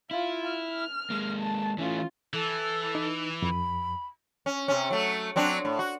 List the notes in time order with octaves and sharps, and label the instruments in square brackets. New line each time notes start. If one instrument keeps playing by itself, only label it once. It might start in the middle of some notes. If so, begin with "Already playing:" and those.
[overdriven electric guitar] E4 [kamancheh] F4 F5
[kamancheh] F6
[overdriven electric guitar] G#3 A#3
[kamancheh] A5
[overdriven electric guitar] E3 A3 [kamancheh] C#4 F4
[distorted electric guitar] E3 [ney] A4
[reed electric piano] D#4
[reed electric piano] F2 [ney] B5
[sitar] C#4
C3 C#4
F#3 A3
F#3 C4 D4
A2
F#4